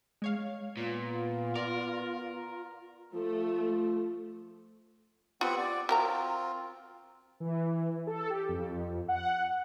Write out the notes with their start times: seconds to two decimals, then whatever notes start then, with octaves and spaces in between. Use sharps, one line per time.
0.22 G#3 C#5 F5
0.77 A#2 B3 F4
1.55 A#4 D5
3.14 F3 A3
5.41 B3 C4 F4 G4 F#5
5.58 D5
5.89 C4 F4 F#4 A#4 A#5
7.40 E3
8.07 A4
8.30 G4
8.49 F2
9.08 F#5